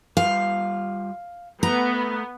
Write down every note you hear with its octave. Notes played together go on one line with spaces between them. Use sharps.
G3 F4 F5
A3 B3 A#5